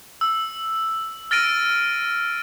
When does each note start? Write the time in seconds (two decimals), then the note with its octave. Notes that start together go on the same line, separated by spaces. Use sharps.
0.21 E6
1.31 F6 A6 A#6 D7 D#7